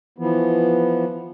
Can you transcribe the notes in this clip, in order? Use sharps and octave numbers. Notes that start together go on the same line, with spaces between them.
E3 F3 B3